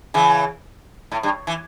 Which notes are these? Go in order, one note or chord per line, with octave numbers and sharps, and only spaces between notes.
C#3 E3
A2
G2
E3